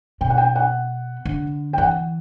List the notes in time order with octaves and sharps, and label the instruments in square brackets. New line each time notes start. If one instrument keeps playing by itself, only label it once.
[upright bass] B2 [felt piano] G5
[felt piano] F#5
G5
F#5
[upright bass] D3
[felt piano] G5
[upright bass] E3 [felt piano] F#5